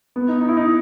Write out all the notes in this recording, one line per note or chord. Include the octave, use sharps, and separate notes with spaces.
B3
D#4
D#4
E4
D#4